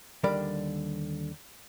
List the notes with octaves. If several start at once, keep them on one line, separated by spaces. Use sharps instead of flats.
D#2 D3 G3 A#4 D5 B5